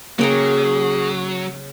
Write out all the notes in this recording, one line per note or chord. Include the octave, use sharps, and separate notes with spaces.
C#3 F#3 A#3 G#4 G5 A#5